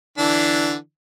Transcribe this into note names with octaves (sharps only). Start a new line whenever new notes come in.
D3 E3 D4